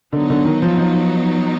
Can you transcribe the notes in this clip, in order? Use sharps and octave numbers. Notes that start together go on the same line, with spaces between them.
D3 F#3 B3 D#4
D3
D#3
F3
F3